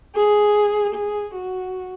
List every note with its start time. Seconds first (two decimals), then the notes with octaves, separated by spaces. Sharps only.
0.15 G#4
0.95 G#4
1.35 F#4